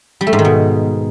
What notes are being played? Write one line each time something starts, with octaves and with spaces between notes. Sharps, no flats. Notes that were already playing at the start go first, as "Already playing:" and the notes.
G3
A3
G#2
D#3
B2